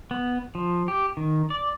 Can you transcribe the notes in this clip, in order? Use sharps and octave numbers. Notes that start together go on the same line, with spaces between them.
B3
F3
G4
D#3
D5